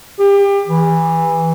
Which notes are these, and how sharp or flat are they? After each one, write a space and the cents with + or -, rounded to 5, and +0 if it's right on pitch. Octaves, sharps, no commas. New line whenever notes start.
G4 +30
E3 -10